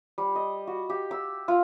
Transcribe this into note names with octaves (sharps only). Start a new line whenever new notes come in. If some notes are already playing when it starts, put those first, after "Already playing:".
G3
D#5
F#4
G4
E6
F4